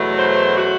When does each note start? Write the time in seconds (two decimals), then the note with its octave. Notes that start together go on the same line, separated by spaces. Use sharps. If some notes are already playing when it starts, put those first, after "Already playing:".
Already playing: E2 B2 F#3 A3
0.17 C5
0.56 F#4